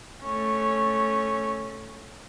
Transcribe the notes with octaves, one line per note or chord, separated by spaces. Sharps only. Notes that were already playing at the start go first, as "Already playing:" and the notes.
A3 C#4